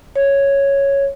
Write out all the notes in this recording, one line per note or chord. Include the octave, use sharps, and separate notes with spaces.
C#5